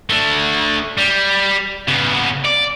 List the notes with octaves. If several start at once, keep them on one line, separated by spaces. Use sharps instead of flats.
A3 D4
G3
C#3 B3
D5